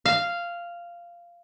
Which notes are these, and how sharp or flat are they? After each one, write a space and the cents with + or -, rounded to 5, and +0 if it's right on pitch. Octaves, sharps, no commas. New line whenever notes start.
F5 -10